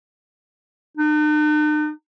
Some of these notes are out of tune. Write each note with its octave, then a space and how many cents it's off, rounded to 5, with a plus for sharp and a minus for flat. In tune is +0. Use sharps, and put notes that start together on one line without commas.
D#4 -45